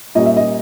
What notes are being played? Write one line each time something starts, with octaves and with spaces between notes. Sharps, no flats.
A#2 G3 A#3 C#4 D#5
E5
D#5